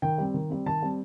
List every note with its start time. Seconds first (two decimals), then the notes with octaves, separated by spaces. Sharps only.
0.02 D#3 G5
0.18 G3 C4
0.34 D#3
0.50 G3 C4
0.66 D#3 A5
0.82 G3 C4